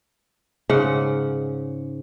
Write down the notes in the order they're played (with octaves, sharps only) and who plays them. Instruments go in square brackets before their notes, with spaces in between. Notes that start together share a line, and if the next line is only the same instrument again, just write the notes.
[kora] G#2 C#3 F#5